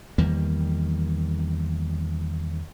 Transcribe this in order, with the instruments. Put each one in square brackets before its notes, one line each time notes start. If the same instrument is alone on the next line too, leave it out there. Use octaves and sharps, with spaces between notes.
[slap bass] E2 D#3 G3 A#3